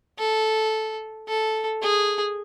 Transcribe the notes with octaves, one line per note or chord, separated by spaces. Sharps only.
A4
A4
G#4